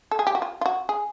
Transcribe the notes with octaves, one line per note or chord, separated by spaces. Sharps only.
A4
G#4
G4
F#4
F4
F4
F#4
G#4